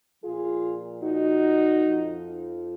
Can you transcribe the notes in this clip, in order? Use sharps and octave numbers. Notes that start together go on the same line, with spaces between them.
A#2 F3 F4 G#4
D#4 F#4
F2 F3